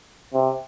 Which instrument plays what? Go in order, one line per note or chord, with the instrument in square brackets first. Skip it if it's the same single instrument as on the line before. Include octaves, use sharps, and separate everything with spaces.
[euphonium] C3